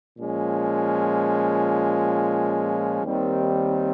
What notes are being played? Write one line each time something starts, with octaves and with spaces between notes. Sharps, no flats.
A#2 F3 G#3 C#4
D#2 D#3 G3 C4